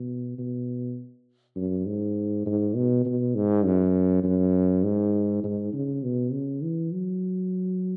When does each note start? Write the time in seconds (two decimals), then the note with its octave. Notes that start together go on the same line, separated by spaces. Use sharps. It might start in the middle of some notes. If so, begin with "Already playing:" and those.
Already playing: B2
0.38 B2
1.56 F#2
1.86 G#2
2.46 G#2
2.75 B2
3.05 B2
3.35 G#2
3.65 F#2
4.24 F#2
4.84 G#2
5.44 G#2
5.73 C#3
6.03 B2
6.32 C#3
6.63 E3
6.92 F#3